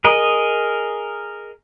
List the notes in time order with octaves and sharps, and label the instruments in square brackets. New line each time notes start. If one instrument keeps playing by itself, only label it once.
[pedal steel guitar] G#4 A#4 D#5